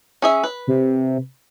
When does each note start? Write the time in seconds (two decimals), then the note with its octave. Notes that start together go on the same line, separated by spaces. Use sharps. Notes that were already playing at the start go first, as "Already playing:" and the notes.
0.22 C#4 G#4 E5
0.44 B4
0.67 C3